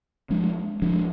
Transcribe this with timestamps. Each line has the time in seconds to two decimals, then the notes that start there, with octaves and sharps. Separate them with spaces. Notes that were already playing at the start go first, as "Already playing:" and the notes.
0.30 F3 G#3 D4
0.82 F3 G#3 D4